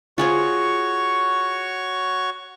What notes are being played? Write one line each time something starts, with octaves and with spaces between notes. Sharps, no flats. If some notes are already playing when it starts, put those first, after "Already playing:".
F4 F#4 G#4 C5 C#5 C#6